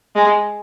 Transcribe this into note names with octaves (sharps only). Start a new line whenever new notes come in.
G#3